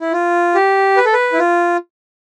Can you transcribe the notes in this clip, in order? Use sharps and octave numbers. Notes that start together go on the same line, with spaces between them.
E4
F4
G4
B4
A4
B4
E4
F4